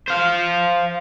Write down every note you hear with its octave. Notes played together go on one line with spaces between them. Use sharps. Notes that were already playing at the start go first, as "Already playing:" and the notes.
C5 F5